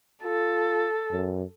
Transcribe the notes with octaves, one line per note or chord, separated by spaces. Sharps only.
F4 A4
F#2